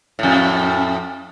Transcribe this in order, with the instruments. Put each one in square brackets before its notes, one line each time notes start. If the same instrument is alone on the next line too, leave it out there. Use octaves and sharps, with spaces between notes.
[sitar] F2 A2